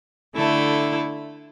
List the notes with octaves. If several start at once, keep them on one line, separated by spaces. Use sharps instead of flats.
D3 A3 E4 A4